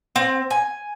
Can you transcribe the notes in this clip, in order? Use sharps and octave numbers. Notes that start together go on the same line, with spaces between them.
C4
G#5